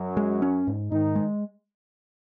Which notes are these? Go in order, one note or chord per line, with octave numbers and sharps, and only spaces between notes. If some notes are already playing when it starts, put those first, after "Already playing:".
Already playing: F#2 F#3
G#3
C#4
G#2
G#2 D#3 D#4
G#3